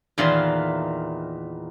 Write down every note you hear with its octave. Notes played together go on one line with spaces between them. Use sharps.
E2 A#2 D#3 E3 F4 C6